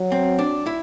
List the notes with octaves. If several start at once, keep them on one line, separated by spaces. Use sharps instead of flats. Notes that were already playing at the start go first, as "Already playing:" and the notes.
Already playing: F#3
C4
D4
E4